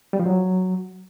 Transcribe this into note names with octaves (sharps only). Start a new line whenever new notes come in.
G3
F3
F#3